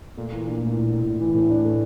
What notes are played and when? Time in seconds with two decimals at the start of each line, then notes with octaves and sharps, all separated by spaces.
0.17 A#2 A3
0.32 E3
0.47 D4
0.61 A2
0.76 A2
0.91 A2
1.06 A2
1.21 E3
1.34 A2 E3
1.50 D4
1.65 A3